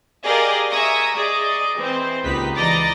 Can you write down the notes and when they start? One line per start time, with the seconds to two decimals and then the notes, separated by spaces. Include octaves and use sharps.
0.24 G4 G#4 A#4 D5 D#5 F5
0.70 E5 G#5 A#5 C#6 D#6
1.15 G#4 D5 D#5
1.76 E3 C4 C5
2.24 C#2 A#2 D#4 G4 B4 B6
2.55 E3 D5 D#5 A#5 A6 A#6